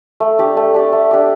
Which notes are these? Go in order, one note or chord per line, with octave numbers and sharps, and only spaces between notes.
A3
D4 G4 D5
A3
D4 G4 D5
A3
D4 G4 D5